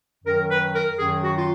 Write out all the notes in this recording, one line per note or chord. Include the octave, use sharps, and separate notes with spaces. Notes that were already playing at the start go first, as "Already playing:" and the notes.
F#2 D#3 F#3 A#4
B4
A#4
F#2 D#3 F#3 G#4
F#4
F4